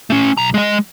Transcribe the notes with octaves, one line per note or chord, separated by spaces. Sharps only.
A3 C#4
B1 A#5
G#3 D#5